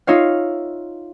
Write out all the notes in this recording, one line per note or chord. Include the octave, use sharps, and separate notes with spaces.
D#4 F4 C#5 E5 F5